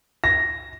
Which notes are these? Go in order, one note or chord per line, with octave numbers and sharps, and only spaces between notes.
A#6